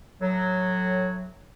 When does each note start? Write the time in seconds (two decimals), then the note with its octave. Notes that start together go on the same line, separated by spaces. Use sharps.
0.22 A2 F#3